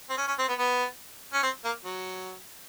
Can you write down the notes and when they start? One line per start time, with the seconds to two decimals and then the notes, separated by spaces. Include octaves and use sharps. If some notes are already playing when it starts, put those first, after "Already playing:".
0.09 C4
0.18 C#4
0.28 C#4
0.39 C4
0.49 B3
0.59 B3
1.33 C#4
1.43 C4
1.64 A#3
1.85 F#3